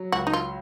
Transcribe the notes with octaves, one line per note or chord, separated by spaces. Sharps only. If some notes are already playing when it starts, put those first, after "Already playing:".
Already playing: F#3
C#2 F#4
D#4
F4